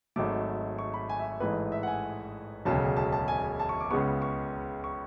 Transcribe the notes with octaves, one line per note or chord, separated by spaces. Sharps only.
G#1 G#2 F#3 A3 D6
C#6
B5
G#5
E5
A1 G#2 E3 A3 B4
E5
F#5
G#5
E1 D2 C#3 F#3 A5
A5
A5
G#5
A5
C#6
D6
C#2 C#3 G#3 B3 C#6
C#6
C#6